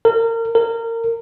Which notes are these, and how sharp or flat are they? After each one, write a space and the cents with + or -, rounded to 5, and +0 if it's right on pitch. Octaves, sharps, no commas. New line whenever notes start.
A#4 -30
A#4 -25